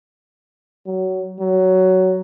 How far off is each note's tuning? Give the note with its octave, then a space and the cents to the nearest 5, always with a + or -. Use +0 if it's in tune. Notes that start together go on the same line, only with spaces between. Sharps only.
F#3 +20
F#3 +15